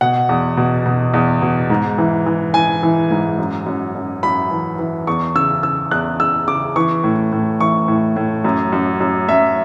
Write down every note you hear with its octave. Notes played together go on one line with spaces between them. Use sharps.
B2 F#5
E2
B2
B2
E2
B2
G#2
E3
E3
E3 G#5
E3
G#2
F#2
F#2
F#2
F#2 B5
E3
E3
E2 C#6
C#3 E6
C#3 E6
E2 F#6
E2 E6
C#3 D6
E3 C#6
A2
A2
E3 C#6
A2
A2
F#2
F#2
F#2
F#2 E5